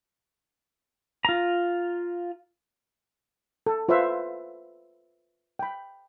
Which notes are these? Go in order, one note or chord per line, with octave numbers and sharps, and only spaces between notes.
F4 A#5
A4
F4 B4 C5 E5 F5
G5 B5